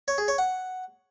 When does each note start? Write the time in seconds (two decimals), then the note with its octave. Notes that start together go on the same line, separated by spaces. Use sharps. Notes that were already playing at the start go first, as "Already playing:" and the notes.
0.08 C#5
0.18 G#4
0.28 C#5
0.38 F#5